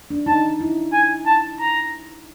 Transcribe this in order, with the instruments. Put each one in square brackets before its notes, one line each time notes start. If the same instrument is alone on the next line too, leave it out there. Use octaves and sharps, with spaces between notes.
[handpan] D4
[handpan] D#4 [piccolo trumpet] A5
[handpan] E4
[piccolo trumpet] G#5
A5
A#5